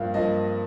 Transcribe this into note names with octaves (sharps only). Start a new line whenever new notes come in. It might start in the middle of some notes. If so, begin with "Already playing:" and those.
Already playing: G2 F3 A#3 F5
G2 F3 A#3 D#5